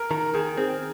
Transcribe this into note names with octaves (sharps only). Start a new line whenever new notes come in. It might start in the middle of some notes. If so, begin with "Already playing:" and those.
Already playing: A#4
D#3 A#4
D#3 G#4
C4 G#4